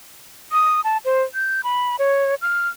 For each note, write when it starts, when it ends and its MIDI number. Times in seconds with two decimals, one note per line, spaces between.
0.52 0.81 87
0.84 0.97 81
1.05 1.23 72
1.34 1.61 91
1.64 1.96 83
1.99 2.35 73
2.42 2.68 89